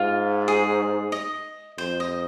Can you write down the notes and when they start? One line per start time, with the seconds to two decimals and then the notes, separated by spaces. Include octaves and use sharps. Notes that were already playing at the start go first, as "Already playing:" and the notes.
Already playing: G#2 F4
0.48 G#4
1.12 D#5
1.78 F2 C5
2.00 D#5